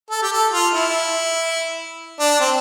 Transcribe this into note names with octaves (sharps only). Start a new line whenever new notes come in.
A4
G4
A4
F4
E4
D4
C4